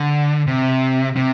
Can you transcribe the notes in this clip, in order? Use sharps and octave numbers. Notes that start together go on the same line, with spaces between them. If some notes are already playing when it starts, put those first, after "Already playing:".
Already playing: D3
C3
C3